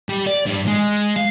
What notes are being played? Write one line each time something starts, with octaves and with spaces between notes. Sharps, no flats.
G3
D5
G2
G#3
F5